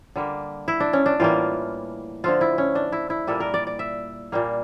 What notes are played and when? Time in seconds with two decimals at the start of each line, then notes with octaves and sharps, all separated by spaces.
0.16 D3 G3 A#3
0.68 E4
0.80 D4
0.93 C#4
1.06 D4
1.20 A2 E3 G3 A#3 F4
2.24 D3 F3 A3 F4
2.41 E4
2.58 C#4
2.75 D4
2.92 E4
3.10 E4
3.27 A#2 G3 A#3 A4
3.40 A#4
3.54 D5
3.67 D5
3.79 E5
4.32 A#2 G3 A#3